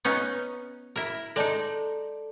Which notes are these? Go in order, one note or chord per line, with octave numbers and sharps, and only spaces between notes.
B3 C#4 D#4
E4 A#4
G#3 D#4 A4 D5 A5